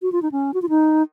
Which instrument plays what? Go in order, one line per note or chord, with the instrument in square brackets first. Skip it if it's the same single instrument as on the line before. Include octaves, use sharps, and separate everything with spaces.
[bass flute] F#4
F4
D#4
C#4
F#4
F4
D#4